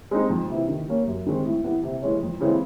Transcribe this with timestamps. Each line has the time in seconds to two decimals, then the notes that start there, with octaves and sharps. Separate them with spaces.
0.11 G#3 C4 D#4
0.30 F2
0.50 C3 E3
0.68 D#3
0.87 G3 A#3 C#4
1.07 F#2
1.26 D#3 G#3 C4
1.46 A2
1.64 E3 G3 B3
1.83 C3
2.02 E3 G#3 C#4
2.22 F2
2.40 C#3 E3 G#3 C4